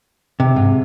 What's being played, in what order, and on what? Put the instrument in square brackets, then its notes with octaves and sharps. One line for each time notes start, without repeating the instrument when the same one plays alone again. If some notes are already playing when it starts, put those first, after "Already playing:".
[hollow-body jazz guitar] C3
[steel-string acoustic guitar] G#2